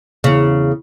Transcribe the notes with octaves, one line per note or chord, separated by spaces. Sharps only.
E2 C#3